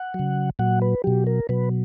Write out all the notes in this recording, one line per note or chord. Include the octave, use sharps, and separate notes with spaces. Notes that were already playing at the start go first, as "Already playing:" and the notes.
Already playing: F#5
C#3 F#3
A#2 F#3 F#5
B4
B2 F#3 G4
A#4
B2 F#3 B4